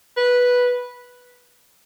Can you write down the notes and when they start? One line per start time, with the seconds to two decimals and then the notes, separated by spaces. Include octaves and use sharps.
0.17 B4